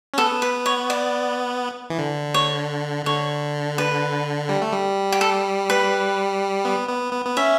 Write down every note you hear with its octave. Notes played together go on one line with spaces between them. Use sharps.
C#4
B3 A4
B4
C#5
D5
E3
D3
C#5
D3 C#5
B4
G3
A3
G3
G4
A4
B4
B3
B3
B3
B3
C#4 E5